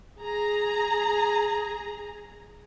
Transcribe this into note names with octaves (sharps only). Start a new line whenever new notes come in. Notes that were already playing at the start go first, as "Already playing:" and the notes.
G#4 A#5